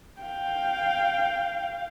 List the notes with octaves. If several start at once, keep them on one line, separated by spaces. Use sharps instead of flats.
F5 G5